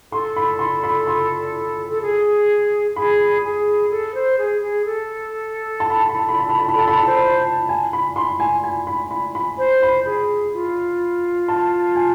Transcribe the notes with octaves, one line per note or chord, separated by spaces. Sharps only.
A4 C6
B5
C6
B5
C6
A4
G#4
G#4 B5
G#4
A4
C5
G#4
G#4
A4
A5
B5
A5
B5
A5
B5
A5
B5
A5
B5
A4 A5
B5
A5
C5
G#5
B5
C6
G#5
G#5
B5
B5
B5
C5
B5
G#4
F4
A5
G#5